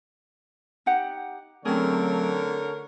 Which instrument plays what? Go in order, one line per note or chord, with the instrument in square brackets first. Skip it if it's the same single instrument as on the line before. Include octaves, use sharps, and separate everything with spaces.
[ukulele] D#4 G4 F#5
[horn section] D3 A#4 C#5 [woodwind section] F#3 A3 C4 [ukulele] C#4 G#4